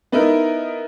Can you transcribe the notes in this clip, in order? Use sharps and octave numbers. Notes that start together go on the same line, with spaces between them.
B3 D#4 E4 A#4